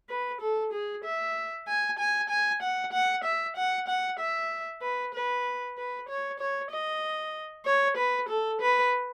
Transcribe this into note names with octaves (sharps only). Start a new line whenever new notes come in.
B4
A4
G#4
E5
G#5
G#5
G#5
F#5
F#5
E5
F#5
F#5
E5
B4
B4
B4
C#5
C#5
D#5
C#5
B4
A4
B4